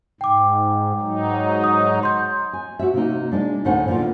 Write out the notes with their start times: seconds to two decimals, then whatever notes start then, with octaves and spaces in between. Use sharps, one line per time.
0.21 G#2 G5 D6
1.01 G#2 F#3 D#4
1.64 D#6
2.03 C6 G6
2.53 G#5
2.79 F#4 E5
2.94 C3 A#3 D#4
3.32 G#3 D4
3.65 D2 A2 D#4 C5 F#5 G#5
3.88 D3 A#3 B3 F4